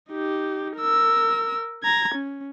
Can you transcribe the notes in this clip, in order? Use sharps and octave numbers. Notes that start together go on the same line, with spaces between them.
D#4 G4
A#4 E6
A#5 G#6
C#4